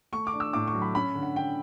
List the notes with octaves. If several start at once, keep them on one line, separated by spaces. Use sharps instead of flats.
A3 C#6
D6
D4
E6
A2 D6
C#6
F#3
B5
C#4 B5
D3
F#5
D3 G5